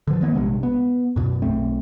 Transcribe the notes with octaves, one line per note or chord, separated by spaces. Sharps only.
D3 F3
D#3 A#3 B3
A#1 G2 C3 G#3
B3
F#2 B2
B1 A3 C4